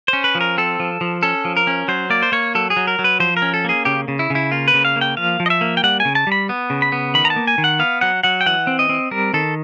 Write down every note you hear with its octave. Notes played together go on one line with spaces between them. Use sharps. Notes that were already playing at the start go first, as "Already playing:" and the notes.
C#4 C5
B4
F3
A#4
C4 A4
F3
F3
C#4 A4
F3
A#4
C#4
F#3 C5
A#3 D5
C5
A#3 C#5
F#3 A4
G#4
F#3
A#4
F#3
B4
F3 C5
A#4
C#4
A4
A#3 G#4
C#3 G4
C#3
E4
C#3 E4
A#3 F4
B4
C#3
F5
A#3
G5
F3 F5
F3
D#5
E5
A#3
G5
G3 F#5
G#5
C#3
A5
G3 B5
B3
C#3
B5
B3
D#3 B5
A#5
A5
A#3
G#5
D#3
F#5
B3 F5
F#3 F#5
F#3 F#5
G5
E3 F#5
C4
D#5
C4
G3 A#4
D#3 A4